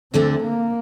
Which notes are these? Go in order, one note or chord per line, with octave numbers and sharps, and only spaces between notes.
D2 D3 A3 C4 D4
A#3